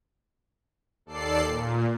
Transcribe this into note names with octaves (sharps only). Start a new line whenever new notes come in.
D#2 A4 D5 C7
A#2